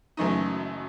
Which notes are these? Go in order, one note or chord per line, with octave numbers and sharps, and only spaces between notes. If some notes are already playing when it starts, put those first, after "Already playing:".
F#1 F#2 E3 A3 D#4